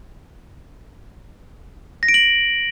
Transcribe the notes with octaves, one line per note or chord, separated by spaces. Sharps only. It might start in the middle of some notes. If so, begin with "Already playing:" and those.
A#6
D7
F#7